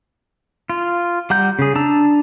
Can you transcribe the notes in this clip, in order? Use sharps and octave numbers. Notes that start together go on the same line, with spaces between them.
F4
G3 F#5 A#5 G6
C#3 G#4
D4 A5 A#5 E6